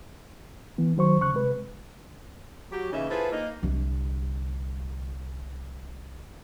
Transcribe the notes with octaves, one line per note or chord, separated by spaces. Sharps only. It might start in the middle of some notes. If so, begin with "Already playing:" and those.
E3 B3
D#3 F#3 C5 C#6
D#2 C#3 C#6 F#6
C3 G#3 B4
F#3 G4
C#3 E3 A#3 C#4 D#4 E5
E4 F4 G#4 A4 B4 C5
A#3 D#4
C2 D3